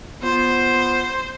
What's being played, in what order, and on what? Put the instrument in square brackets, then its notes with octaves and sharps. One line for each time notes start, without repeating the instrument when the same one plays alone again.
[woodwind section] B3 F4 [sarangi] C5